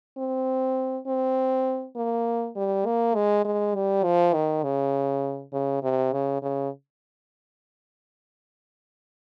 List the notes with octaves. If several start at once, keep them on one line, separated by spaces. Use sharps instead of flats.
C4
C4
A#3
G3
A#3
G#3
G#3
G3
F3
D#3
C#3
C#3
C3
C#3
C#3